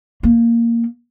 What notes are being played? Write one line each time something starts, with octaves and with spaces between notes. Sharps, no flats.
A#3